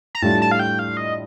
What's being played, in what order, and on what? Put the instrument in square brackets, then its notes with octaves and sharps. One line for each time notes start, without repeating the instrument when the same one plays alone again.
[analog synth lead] A#5
[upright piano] A2 G3 D4 F4 [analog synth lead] A5
[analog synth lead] A5
F5
G5
F5
D#5